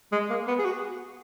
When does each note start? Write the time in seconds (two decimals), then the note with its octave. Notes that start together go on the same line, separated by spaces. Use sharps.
0.12 G#3
0.30 A#3
0.48 B3
0.59 G#4
0.65 F#4